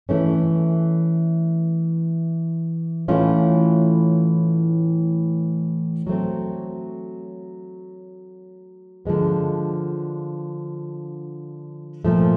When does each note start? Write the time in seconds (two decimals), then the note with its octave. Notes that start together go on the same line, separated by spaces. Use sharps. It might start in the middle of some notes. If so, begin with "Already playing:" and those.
0.09 E3 A3 C#4
3.08 A2 E3 A3 C#4 F4
6.07 F#3 A3 C4
9.05 D3 F3 G#3 B3
12.05 A#2 F3 A3